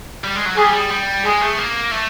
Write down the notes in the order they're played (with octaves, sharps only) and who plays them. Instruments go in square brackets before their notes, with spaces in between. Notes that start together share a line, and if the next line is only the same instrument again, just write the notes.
[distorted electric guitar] G3
G#3
F#3
[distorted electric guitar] G3 [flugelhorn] G#4
[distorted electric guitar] G3
G3
[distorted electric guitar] G#3 [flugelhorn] G#4
[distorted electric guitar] A3
A#3
A3